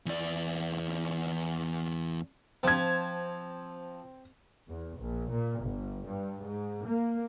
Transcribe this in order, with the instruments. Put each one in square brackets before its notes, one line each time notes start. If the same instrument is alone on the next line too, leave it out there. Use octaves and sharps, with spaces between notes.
[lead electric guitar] E2 D5
[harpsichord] F3 A5 [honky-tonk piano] C4 G#6
[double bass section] E2
A#1
A#2
G1
G2
G#2
A#3